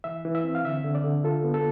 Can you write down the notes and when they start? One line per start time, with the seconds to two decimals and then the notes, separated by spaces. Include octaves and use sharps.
0.04 E3 E5
0.25 E3
0.35 E5
0.44 C4
0.55 F5
0.64 D3 E5
0.84 D3
0.95 D5
1.04 D3
1.24 F4 A4
1.44 B3
1.54 A4